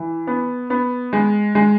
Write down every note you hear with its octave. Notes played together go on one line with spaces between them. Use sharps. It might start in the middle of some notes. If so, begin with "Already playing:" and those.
Already playing: E3
B3
B3
G#3
G#3